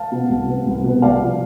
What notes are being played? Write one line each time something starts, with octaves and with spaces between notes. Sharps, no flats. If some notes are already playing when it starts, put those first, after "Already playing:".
Already playing: F5 A5
B2 B3
C2
B2 B3
C2
B2 B3
C2 D5 F5
C3 F3